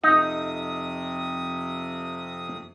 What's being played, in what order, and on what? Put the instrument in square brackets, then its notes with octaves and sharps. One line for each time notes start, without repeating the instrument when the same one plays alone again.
[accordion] F2 C3 D#6 [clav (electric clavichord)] D#4